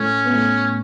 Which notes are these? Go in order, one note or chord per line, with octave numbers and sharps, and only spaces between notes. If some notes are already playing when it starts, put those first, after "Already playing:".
Already playing: A2 A3 C#4
B3
A2 A3